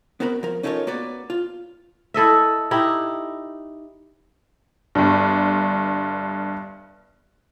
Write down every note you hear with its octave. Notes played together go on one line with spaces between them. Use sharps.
B3 C4 F#4 A#4 B5
F3 A#4
C#4 D#4 F4 A4 A#4 C#5
A#3 B3 F#4 B4 D5
F4
E4 A4 D#5 E5
D#4 E4 G4
G1 G2